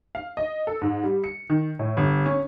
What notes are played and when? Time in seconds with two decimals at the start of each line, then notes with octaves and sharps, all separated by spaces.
0.15 F5
0.37 D#5
0.67 A4
0.81 G#2
1.03 G3
1.24 C#7
1.50 D#3
1.79 A2
1.97 G1
2.26 C#4